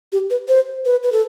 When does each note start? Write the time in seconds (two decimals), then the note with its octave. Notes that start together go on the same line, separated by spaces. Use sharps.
0.12 G4
0.30 B4
0.48 C5
0.85 B4
1.03 B4
1.12 A4